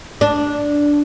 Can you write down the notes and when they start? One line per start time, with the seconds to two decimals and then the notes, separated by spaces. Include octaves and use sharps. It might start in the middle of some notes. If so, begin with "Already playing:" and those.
0.21 D4